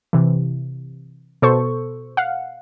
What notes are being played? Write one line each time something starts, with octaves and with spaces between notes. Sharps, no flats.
C3 E3
B2 A4 C5 C#6
F5 F#5